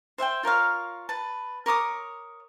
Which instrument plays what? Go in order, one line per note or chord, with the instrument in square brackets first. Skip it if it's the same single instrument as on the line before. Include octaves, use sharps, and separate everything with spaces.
[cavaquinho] C5 E5 F#5 G5
F4 A#4 C#5 F5
B4 A5
A#4 C#5 D6 D#6